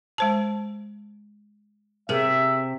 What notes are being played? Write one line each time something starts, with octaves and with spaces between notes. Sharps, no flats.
G#3 C5 A5
C3 G#4 A#4 E5